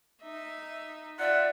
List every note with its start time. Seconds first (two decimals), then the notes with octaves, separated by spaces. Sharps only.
0.23 D#4 E5
1.19 F4 D5 E5 F#5